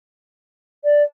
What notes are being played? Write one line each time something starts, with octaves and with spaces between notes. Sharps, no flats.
D5